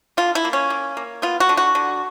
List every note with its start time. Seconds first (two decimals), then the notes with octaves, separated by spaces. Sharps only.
0.17 D3 F4
0.35 E4
0.45 A#3
0.53 C#4
0.70 A#3
0.97 A#3
1.22 B3 F4
1.40 F#4
1.49 D3
1.57 F#4
1.75 D3